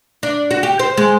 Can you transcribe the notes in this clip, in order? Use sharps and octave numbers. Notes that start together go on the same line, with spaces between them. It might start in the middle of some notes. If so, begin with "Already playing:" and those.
D4
F#4
G4
C5
G#3